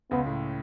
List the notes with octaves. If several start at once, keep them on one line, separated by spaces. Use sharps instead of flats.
C#2 C#3 B3
A2